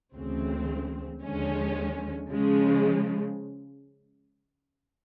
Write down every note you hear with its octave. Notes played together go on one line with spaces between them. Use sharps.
D2 C#3 E3 G#3 C4
D#2 D3 F3 G#3 C#4
C#3 F3 G#3